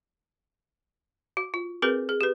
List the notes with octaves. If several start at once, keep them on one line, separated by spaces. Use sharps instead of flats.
F#4
F4
C4 F#4 G#4 A#4 B4
G#4
G4 B4